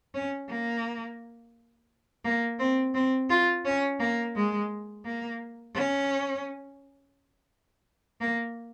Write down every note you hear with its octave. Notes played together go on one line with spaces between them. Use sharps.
C#4
A#3
A#3
C4
C4
F4
C#4
A#3
G#3
A#3
C#4
A#3